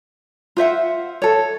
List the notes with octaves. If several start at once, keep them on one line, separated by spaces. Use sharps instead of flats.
F4 C5 E5 F#5
A4 C#5